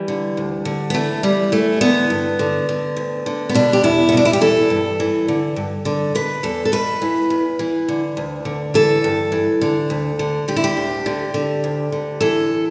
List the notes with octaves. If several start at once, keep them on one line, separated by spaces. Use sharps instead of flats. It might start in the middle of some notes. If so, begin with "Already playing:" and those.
Already playing: E3 G3
D3
D2
D3
B3
E3 A3
E2 G3
E3 A3
D3 B3
G2
D3
D3
D2
D3
B3
B2 D4
G4
E2 E4
B3
B2 D4
E4
G4
E3 A4
G2
E3
D3
G2
D3
B2 B4
E2 A4
A4
B2 B4
E3
E2
E3
D3
D2
D3
E3 A4
G2
E3
D3
D2
D3
D3 G4
E4
G4
D2
D3
D3
D2
D3
E3 A4